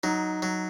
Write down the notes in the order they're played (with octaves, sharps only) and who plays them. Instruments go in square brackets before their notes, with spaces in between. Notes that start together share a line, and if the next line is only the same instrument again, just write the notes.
[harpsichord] F#3 [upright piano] D#4
[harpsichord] F#3